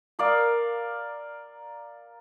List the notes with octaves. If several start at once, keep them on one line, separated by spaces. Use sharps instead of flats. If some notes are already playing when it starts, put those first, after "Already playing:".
A#4 D5 F5